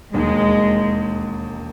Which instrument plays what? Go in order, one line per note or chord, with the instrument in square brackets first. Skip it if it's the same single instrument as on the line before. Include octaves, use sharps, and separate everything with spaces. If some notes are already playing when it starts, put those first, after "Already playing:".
[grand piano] E1 D#2 D#3 [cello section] G#3